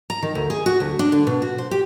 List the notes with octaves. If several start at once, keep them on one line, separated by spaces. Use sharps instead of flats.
A#5
D#3
D2
G#4
F#4
D2
D4
D3
B2
F#4
C5
G4